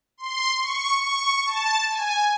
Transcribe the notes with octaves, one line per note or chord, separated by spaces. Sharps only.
C6
C#6
C#6
A5
G#5